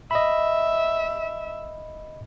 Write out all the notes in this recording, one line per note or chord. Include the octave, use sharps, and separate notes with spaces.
D#5 E5 B5